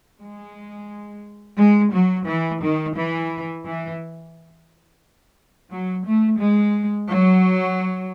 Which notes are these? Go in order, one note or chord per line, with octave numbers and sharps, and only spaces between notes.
G#3
G#3
F#3
E3
D#3
E3
E3
F#3
A3
G#3
F#3